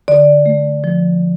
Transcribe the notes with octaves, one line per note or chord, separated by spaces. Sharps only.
D3 D5
A3
F3